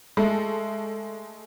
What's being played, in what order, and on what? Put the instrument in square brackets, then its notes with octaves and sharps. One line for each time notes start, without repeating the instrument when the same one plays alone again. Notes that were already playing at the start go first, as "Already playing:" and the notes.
[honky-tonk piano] G#3 A3 A4